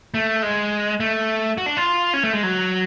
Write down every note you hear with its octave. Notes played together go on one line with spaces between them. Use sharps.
A3
G#3
A3
F#4
D4
F4
C#4
A3
G#3
F#3